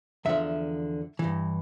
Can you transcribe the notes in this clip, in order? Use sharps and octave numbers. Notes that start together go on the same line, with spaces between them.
E2 D3 F3 E5
G2 E3